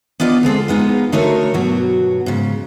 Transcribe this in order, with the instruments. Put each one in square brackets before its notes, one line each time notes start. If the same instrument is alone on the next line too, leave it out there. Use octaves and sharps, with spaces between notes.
[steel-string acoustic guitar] B3 D4 F4 D5 D#5
D3 G#3 C4 A4
G#3 B3 D#4 F4
D3 A3 D#4 F#4 A#4 C#5
G2 B2 F#3 F#4
G#2 C#3